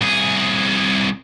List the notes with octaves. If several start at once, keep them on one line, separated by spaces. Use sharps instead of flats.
C2 G#4